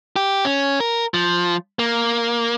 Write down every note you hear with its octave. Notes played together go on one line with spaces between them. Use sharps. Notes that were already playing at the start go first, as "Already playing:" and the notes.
G4
C#4
A#4
F3
A#3